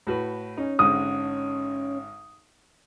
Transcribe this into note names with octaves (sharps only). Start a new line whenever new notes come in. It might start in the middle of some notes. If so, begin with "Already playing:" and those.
A2 F#4 B4
C#4 D#4
G#1 G#2 D3 D#6